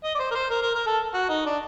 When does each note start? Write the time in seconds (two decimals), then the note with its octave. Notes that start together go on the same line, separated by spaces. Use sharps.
0.04 D#5
0.15 D5
0.19 C5
0.31 A#4
0.35 C5
0.51 A#4
0.62 A#4
0.75 A#4
0.87 A4
1.14 F#4
1.29 D#4
1.46 D4